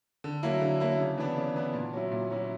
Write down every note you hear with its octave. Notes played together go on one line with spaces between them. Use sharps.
D3
F#3 A#3 E4
D3
F#3 A#3 E4
C#3
E3 B3 D4
C#3
E3 B3 D4
A#2
F#3 C#4 E4
A#2
F#3 C#4 E4